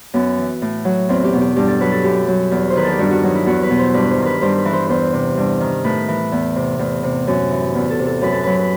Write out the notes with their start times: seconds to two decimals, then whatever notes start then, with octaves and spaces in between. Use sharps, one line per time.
0.14 F#2 B3
0.38 E3
0.62 A2
0.85 F#3
1.09 E2 C4
1.24 G4
1.33 B2
1.41 G4
1.56 G2 G4
1.68 A4
1.80 F#3 B4
1.92 A4
2.04 F#2 G4
2.28 F#3
2.52 E2
2.70 C5
2.75 D#3 B4
2.84 A4
2.92 G4
2.99 G2 F#4
3.11 F#4
3.23 F#3 D#4
3.35 E4
3.46 E2 F#4
3.63 B4
3.70 B2
3.78 C5
3.94 G2 B4
4.10 C5
4.19 D#3
4.25 B4
4.41 G2 C5
4.57 B4
4.65 E3
4.73 C5
4.89 E2 C5
5.13 C3
5.37 G2
5.61 D#3
5.84 A2 B4
6.08 E3
6.32 E2
6.56 C3
6.79 E2
7.03 C3
7.27 F#2
7.51 E3
7.75 E2
7.90 A4
7.99 C3
8.06 A4
8.22 F#2 B4
8.32 A4
8.43 F#3 B4
8.59 B4